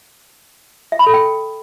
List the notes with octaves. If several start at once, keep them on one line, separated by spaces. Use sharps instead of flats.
E5
B5
A4
G5